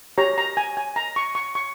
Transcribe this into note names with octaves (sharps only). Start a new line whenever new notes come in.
G4 C#5 A#5
A#5
G#5
G#5
A#5
C#6
C#6
C#6